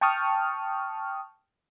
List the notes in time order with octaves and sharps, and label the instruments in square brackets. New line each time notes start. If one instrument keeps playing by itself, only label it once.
[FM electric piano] G5 A5 C#6 D#6 F6